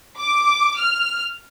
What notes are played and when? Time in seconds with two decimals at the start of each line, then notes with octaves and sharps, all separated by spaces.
0.19 D6
0.79 F6